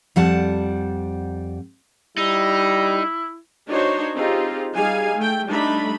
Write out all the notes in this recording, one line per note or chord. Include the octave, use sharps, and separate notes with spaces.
F2 G3 F#5 A5
G3 D#4 E4
D4 D#4 F#4 C5 C#5
C4 D#4 F4 G4 G#4
G3 D#4 G#4 F5 G#5
A3 G5
G3 A3 D4 D#4 B5